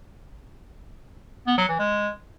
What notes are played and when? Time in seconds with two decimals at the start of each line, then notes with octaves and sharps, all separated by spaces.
1.47 B3
1.58 F#3
1.68 E3
1.79 G#3